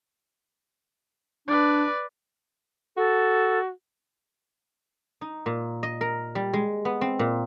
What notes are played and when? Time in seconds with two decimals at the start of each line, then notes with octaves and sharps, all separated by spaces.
1.48 D4 B4 D5
2.97 F#4 A4
5.21 D#4
5.46 A#2
5.83 D#5
6.01 A#4
6.35 G3
6.53 G#3
6.85 B3
7.01 C4
7.19 A#2